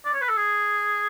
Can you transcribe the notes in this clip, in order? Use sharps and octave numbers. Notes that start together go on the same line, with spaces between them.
D5
C#5
B4
A4
G#4